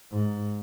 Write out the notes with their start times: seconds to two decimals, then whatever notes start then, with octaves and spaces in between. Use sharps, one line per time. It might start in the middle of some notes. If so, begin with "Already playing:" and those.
0.12 G#2